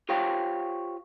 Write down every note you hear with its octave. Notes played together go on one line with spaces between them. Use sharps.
F4 G4 C5 C#5 F5 G5